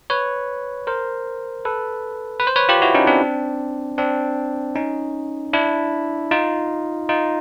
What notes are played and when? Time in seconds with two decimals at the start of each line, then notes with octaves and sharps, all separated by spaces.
0.10 B4 C#5
0.87 A#4 C5
1.65 A4 B4
2.40 B4
2.47 C5
2.56 B4 C#5
2.69 F4 G4
2.82 E4 F#4
2.94 C#4 D#4
3.07 C4 D4
3.98 C4 D4
4.76 C#4 D#4
5.53 D4 E4
6.31 D#4 F4
7.09 D#4 F4